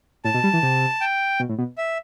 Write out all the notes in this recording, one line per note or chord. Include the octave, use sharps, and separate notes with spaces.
A2 A5
B2
G3
E3
C3
G5
B2
A2
B2
E5